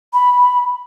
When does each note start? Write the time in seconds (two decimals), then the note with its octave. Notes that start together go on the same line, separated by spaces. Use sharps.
0.13 B5